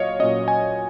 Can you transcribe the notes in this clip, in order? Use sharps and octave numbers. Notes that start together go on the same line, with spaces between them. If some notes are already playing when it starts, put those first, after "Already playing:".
Already playing: A#2 F#3 C#5 D#5 F5
A#2 F#3 C#4 D#5
G#5